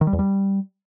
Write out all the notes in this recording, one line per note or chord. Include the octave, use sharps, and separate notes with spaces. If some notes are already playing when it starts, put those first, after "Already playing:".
D#3
G3
E2
G3